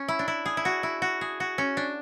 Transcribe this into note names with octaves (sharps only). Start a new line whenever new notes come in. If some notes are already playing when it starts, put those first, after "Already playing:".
Already playing: C#4
E4
D4
E4
G#4
E4
F#4
E4
F#4
G#4
F#4
C#4
D4